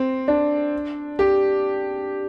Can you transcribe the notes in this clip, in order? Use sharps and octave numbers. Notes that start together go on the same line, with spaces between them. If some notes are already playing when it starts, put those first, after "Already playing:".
Already playing: C4
D4
G4